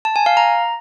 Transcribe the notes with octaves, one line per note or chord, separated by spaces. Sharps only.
A5
G#5
F5
A#5